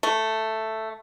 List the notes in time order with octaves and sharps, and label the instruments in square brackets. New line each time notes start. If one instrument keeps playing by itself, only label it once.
[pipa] A3